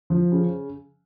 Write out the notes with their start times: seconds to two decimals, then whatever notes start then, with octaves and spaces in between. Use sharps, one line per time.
0.10 F3
0.32 C#3